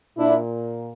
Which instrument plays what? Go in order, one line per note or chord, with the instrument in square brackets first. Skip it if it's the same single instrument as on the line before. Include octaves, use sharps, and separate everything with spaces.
[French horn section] A#2 D4 E4